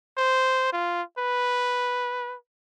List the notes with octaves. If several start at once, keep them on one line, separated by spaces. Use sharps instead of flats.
C5
F4
B4